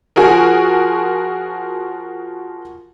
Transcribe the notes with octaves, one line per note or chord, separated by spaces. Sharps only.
F3 F#4 G#4 A#4